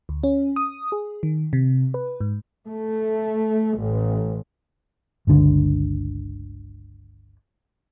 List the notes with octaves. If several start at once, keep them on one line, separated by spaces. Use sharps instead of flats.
D2
C#4
D#6
G#4
D#3
C3
B4
G#2
A3
A1
G1 C#2 D3